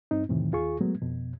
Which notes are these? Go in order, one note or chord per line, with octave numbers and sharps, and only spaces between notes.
G2 C4 D#4
F2 A2 C3 D#3 E3
D#2 F4 G#4 C#6
F#3 G#3 A3 B3
F2 B2